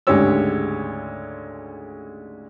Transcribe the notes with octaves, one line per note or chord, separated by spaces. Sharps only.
D2 G#2 C#3 G4 C#5 E6